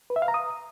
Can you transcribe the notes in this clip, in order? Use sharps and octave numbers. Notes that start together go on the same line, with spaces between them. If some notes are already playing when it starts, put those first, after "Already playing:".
B4
E5
F5
A#5
D#6